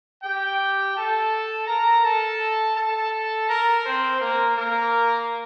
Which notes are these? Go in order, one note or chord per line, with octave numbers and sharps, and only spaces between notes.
G4 G5
A4 A5
A#4 A#5
A4 A5
A4 A5
A#4 A#5
C4 C5
A#3 A#4
A#3 A#4